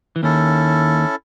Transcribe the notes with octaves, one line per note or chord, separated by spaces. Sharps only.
E3
D#2 D#3 C#4 E4 A4